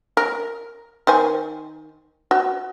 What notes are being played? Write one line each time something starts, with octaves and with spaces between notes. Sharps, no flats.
A#4
D#3 C5 G#5
F#4